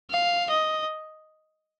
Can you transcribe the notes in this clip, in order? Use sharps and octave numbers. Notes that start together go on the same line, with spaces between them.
F5
D#5